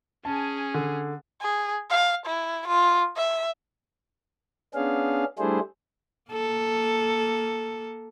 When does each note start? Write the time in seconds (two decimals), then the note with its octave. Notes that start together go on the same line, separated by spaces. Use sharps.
0.25 C#4 G#4 A5
0.74 D3
1.41 G#4
1.90 F5
2.26 E4
2.68 F4
3.17 E5
4.74 B3 C#4 D4 G#4 F5
5.39 G3 A3 D4 E4 G#4 C5
6.31 A#3 A4